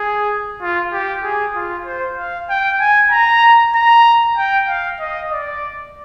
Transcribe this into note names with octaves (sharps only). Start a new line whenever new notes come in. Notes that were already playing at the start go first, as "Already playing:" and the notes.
Already playing: G#4
F4
G4
G#4
F4
C5
F5
G5
G#5
A#5
A#5
G5
F5
D#5
D5